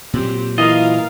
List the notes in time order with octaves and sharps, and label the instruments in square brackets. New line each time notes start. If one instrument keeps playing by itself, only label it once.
[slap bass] A#2 F#3 [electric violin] C4 G4
[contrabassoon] E3 [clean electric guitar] F4 D#5 [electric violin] A#4 F5